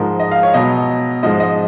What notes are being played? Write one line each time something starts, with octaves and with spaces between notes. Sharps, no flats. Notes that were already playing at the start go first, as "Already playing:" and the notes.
Already playing: G#2 F3 G#3 A#4
D#5
F5
C#5
B2 F#3 D#5
G#2 F3 G#3 D#5
D#5